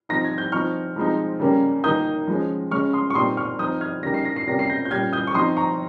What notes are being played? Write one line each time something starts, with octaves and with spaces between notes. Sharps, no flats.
F3 C4 D#4 A#6
G#6
G6
F3 C4 D#4 C#6 F6
F3 G#3 C4 D#4
C#3 G3 A#3 C#4
D#3 A#3 D#4 D#6 G6
F3 G#3 C#4
C#3 G#3 C#4 C#6 F6
C6 D#6
C#6
A#2 G3 C4 D#4 C6 D#6
C#6 F6
F3 C4 D#4 D#6 G6
F6 G#6
C#3 G3 A#3 D#4 A#6
C7
A#6
C7
C3 G3 A#3 C#4 A#6
C7
G6 A#6
G6
A#2 G3 C#4 F6 G#6
D#6 G6
C#6
F3 C4 D#4 C6 D#6
A#5 C#6